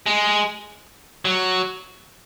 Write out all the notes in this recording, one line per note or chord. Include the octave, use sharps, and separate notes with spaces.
G#3
F#3